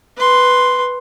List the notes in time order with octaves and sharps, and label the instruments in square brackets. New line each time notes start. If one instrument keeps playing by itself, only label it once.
[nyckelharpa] B4 C6